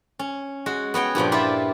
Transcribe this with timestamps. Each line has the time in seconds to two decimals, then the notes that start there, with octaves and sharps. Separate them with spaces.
0.19 C#4
0.66 G#3 F#4
0.94 B3 F#4 C#5 G5
1.15 G2 A#2 F3 G5
1.32 E4 F4 G4 D5 E5